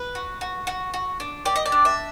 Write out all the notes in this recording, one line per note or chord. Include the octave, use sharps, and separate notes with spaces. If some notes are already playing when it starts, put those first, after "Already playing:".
Already playing: B4
F#4
F#4
F#4
F#4
D4
G4 D5
D#5
D5
D4
E5